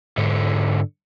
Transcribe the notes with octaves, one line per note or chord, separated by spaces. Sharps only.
G#2 D3